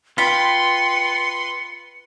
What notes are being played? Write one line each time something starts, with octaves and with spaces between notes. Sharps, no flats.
F4 B4 G5 B5 C6 C#7